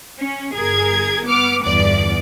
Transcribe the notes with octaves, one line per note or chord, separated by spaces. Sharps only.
C#4
G1 G#4 A#4 G#6
B3 D6 F6
G1 E2 D5 D6